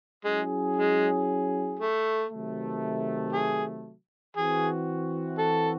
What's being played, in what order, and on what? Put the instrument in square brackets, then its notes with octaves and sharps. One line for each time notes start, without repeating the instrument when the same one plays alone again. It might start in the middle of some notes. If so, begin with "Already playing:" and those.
[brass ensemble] F#3 C#4 E4 G#4 [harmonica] G#3
[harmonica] G#3
A3
[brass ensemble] C3 D#3 F#3 A3
[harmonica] G#4
[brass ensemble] E3 C4 F#4 [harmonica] G#4
[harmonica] A4